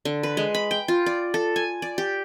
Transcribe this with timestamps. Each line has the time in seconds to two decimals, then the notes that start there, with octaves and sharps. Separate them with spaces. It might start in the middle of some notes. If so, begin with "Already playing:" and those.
0.05 D3
0.23 B4
0.37 G#3
0.55 B5
0.71 G5
0.88 F4
1.06 D5
1.34 A4
1.56 G#5
1.82 D5
1.98 G4